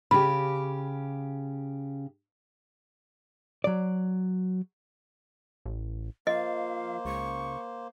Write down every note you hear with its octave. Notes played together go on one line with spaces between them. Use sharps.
C#3 G4 B5
F#3 D5
A1
F3 A#3 C5 D#5 F5
C#2 C#6